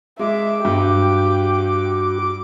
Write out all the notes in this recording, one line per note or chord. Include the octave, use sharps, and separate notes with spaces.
G#3 E5 D6
G2 F#4 G4